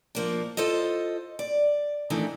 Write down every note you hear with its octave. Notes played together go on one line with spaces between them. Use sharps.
F3 A#3 D4
F4 A4 C5 D#5
D5
D#3 E3 A3 D4 D#4